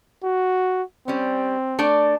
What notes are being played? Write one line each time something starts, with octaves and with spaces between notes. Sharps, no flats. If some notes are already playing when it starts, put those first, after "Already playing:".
F#4
G3 C4 C#4
A3 D4 D5